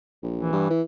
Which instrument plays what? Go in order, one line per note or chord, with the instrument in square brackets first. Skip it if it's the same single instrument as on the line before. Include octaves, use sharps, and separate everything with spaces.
[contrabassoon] A#1
[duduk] E3
[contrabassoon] G2
E3